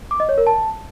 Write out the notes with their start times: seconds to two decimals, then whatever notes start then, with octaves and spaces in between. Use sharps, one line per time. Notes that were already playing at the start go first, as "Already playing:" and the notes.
0.11 D6
0.20 D#5
0.29 C#5
0.38 A#4
0.47 A5